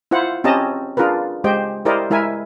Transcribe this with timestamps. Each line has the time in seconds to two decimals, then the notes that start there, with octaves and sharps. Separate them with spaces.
0.11 E4 F4 C5 F#5
0.44 C4 C#4 G4 D#5 A5 A#5
0.97 D4 F4 G#4 A#4 B4
1.44 G#3 G4 C5 D#5 G5
1.85 E4 G4 A#4 C5 D5 D#5
2.10 G#3 E4 A#4 E5 G#5